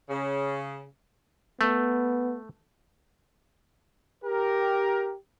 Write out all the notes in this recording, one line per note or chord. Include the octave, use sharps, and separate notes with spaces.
C#3
A3 B3
G4 A#4